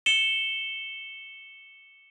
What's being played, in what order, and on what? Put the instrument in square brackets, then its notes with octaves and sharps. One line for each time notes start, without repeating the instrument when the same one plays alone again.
[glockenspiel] C#7 E7 G7